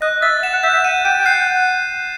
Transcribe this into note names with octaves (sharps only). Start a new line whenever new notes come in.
D#5 F#6
E5 A6
F#5 E7
F#5
E5 G6
E5
F#5 D#7
G5 D#7
G5
F#5 C7